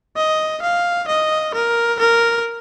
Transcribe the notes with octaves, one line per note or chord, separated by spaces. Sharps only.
D#5
F5
D#5
A#4
A#4